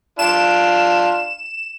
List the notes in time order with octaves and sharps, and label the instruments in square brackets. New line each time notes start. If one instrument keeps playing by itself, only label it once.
[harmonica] D4 F4 [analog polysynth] E7